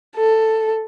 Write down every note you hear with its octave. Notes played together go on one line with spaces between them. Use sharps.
A4